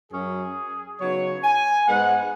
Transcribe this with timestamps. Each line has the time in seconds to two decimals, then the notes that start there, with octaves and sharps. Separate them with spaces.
0.12 F#2 F#3 C#4 G#4
0.99 C#3 F#3 B3 D#4 C#5
1.43 G#5
1.87 G#2 G#3 B3 F#5